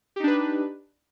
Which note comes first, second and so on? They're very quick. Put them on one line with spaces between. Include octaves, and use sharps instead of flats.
G4 D#4 D4 B4